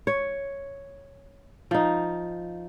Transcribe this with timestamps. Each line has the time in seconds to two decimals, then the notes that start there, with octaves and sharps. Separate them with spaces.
0.07 C#5
1.71 F3 D#4